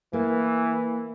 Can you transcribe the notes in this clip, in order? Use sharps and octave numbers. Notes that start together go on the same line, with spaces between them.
E3 A#3